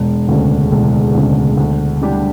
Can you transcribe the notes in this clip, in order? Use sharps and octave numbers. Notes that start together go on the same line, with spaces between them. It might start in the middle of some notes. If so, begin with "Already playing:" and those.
Already playing: E1
D2 C#3
E1
D2 C#3
D2
D3 G3 D4 G4